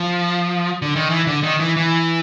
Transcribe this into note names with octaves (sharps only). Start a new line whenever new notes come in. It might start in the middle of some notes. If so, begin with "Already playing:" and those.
Already playing: F3
D3
D#3
E3
D3
D#3
E3
E3